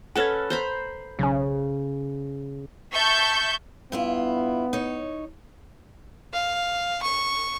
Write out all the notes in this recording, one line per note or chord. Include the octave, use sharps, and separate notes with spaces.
C#4 A4 B4 F#5 F6 G#6
C5 A#5 B5
B1 C#3 C#4
E5 A5 C#6 G6
G2 B3 E4 F4
D#4 C#5
F5
C#6